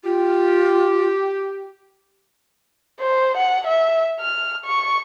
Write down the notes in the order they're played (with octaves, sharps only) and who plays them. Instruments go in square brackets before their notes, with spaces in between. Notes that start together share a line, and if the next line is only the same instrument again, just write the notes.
[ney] F4 [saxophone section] G4
[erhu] C5
F#5
E5
F6
C#6